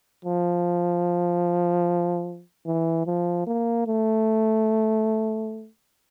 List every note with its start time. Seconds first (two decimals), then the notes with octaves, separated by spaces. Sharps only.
0.25 F3
2.66 E3
3.07 F3
3.47 A#3
3.87 A3